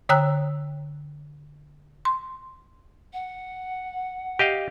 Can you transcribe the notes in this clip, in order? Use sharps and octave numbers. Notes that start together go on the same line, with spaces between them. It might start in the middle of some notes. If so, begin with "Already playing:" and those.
D3 C#5 G5 A#5 E6 F#6
C6
F#5
G4 D#5 F5